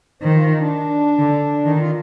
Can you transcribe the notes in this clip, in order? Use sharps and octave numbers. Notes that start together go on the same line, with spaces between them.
D#3 C5
F4
D#4
D4
D3
D#3 D#4
F4